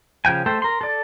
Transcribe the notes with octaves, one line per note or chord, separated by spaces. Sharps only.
C#3 F3 G5 G#5
A3 A4 C5 G5
A#4 C6
A4 D5